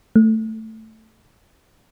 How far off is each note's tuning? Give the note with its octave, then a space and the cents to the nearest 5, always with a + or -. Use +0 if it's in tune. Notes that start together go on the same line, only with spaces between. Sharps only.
A3 +5